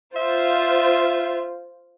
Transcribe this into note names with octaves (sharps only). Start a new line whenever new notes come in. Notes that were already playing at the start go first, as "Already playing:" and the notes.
F4 C5 E5